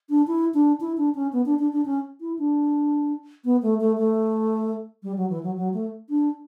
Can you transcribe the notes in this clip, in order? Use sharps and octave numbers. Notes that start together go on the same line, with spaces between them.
D4
E4
D4
E4
D4
C#4
B3
D4
D4
D4
C#4
E4
D4
B3
A3
A3
A3
G3
F#3
E3
F#3
F#3
A3
D4